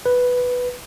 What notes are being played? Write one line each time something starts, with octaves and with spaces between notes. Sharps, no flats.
B4